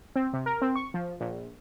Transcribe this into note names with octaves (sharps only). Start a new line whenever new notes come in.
C4
C3
A#4
C4
C#6
F3
A#1